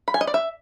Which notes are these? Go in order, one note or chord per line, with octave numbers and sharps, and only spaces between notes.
B5
G#5
D#5
D5
E5